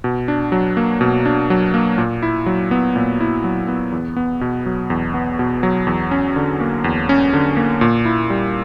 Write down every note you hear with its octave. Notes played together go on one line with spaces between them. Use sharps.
B2
D4
F#3
A#3
B2
D4
F#3
A#3
A#2
E4
F#3
B3
A#2
E4
F#3
B3
E2
B3
B2
F#3
E2
B3
B2
F#3
E2
C#4
D3
A#3
E2
C#4
D3
A#3
A#2
E4
G3